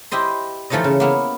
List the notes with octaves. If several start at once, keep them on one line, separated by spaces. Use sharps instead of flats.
E4 G4 C5 D#5 C6
E3 F3 A3 D#4 C#5 D#5
C#3
A#3 B3 E4